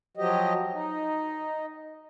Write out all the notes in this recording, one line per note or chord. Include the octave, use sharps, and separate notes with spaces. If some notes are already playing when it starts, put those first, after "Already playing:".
F3 F#3 G4 D#5
D#4